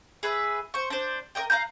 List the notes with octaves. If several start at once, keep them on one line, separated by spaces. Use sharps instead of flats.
G#4 B4 E5
C5 C#6
D4 C5
A#4 D5 D#5 G5
F5 A#5 F#6 G6